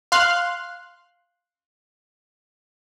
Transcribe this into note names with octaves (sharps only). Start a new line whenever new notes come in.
F5 C6 F6 F#6